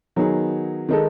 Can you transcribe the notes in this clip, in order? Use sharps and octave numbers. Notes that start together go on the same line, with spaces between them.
D#3 F#3 B3 D#4 G#4
D#3 G#3 D#4 A4